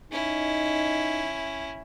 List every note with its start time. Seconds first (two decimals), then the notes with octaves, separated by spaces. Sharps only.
0.12 C#4 D#4 E4